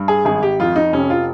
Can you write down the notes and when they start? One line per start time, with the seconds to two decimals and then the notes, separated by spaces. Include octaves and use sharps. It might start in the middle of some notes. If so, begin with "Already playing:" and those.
Already playing: G2
0.08 G#4
0.25 G#1 G#4
0.43 G4
0.60 F2 F4
0.76 D#4
0.93 F1 C#4
1.10 F4